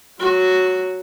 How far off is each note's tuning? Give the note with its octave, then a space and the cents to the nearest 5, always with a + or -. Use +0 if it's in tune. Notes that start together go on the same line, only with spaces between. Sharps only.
F#3 +0 F#4 +0